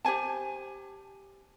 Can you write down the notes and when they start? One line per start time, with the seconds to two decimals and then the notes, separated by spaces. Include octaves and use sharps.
0.05 G4 C5 G#5 A5